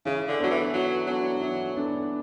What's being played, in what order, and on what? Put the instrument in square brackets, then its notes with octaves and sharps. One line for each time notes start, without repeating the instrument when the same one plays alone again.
[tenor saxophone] C#3 [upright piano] E3
[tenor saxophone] D3
[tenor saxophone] F#3 [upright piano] B3 D4 A4
[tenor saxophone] E3
[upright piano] E3 [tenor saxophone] F#3
[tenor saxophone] F#3 [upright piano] B3 D4 A4
[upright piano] E3
B3 D4 A4